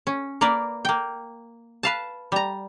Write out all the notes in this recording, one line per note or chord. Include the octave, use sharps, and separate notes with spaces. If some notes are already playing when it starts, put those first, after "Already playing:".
C#4
A#3 A#4 B4 D5
A#3 G5
B4 F5 A5
G3 A#5